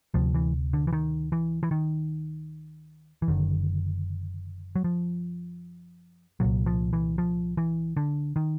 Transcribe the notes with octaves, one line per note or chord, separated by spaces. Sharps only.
D2 C3 F3
E3
D3
E3
D#3
E3
E3
D#3
E3
F#1 F#2 D3 D#3
F#3
F3
C2 A#2 F#3
F3
E3
F3
E3
D3
D#3